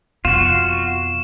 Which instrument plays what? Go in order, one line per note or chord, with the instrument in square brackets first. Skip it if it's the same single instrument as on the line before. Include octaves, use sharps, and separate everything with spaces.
[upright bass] F2 B2 [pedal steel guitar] F4 F#4 [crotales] E7